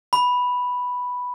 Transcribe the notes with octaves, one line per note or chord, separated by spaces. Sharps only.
B5